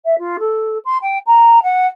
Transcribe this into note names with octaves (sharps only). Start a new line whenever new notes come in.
E5
F4
A4
C6
G5
A#5
F#5